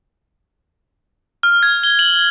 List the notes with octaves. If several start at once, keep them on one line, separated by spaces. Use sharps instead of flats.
F6
G#6
G7
F#7